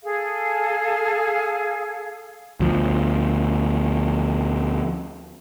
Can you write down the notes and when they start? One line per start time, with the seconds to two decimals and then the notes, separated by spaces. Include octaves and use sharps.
0.03 G#4 A4 F5
2.60 D2 F3